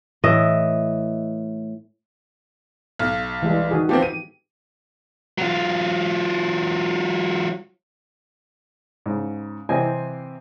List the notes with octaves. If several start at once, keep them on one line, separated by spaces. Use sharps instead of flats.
A2 E3 D#5 E5
B1
E3 G3 G#3
D#3 F#4 G#4
F3 B3 C4 G4
D#7
F#3 F4
G#2 C#3
C3 E3 C4 C5 D#5 G#5